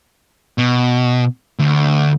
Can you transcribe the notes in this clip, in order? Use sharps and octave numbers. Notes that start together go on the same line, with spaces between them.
B2
D2